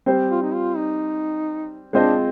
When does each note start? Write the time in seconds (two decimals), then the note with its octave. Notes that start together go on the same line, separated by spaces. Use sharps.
0.06 G3 C4 G4 C5
0.30 F4
0.42 D#4
0.53 F4
0.76 D#4
1.93 G#3 C4 D4 F4 C5 D#5